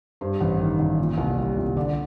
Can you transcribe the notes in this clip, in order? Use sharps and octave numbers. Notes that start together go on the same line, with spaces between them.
G2 C5
A1
D#3
A1
A#2
C2
G3
C2
D3 D5